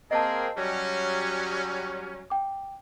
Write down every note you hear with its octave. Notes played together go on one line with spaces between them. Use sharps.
A#3 C4 G#4 D#5 A5
F#3 G3 C#4
G5 D6